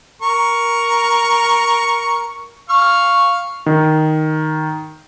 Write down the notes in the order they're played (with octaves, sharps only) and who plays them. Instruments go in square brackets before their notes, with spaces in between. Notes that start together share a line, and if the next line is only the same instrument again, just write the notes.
[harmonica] A#4 C#6
F5 C#6 F6
[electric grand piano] D#3